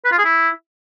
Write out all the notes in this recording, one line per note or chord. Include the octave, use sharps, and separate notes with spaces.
B4
F4
G#4
E4